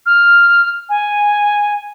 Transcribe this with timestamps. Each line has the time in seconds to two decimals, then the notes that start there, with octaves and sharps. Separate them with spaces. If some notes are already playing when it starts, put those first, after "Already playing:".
0.06 F6
0.89 G#5